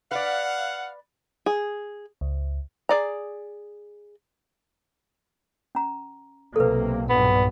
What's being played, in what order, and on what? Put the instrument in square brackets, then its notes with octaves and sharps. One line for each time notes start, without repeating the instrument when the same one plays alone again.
[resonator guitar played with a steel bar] B4 D5 [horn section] F5 F#5
[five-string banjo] G#4
[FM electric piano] C#2
[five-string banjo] G#4 D5 A#5
[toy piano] C#4 A#5
[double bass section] B1 C3 A#3 [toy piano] A4 B4
[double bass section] B1 G2 A#2 [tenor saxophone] B3